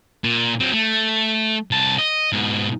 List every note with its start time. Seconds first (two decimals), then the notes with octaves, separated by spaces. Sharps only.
0.24 A#2
0.60 F#3 C4
0.73 A3
1.71 C2 A5
1.98 D#5
2.32 G#2 B2